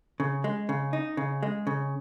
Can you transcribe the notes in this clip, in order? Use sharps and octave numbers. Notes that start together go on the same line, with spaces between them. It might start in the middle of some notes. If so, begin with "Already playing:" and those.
C#3
G#3
C#3
D#4
C#3
G#3
C#3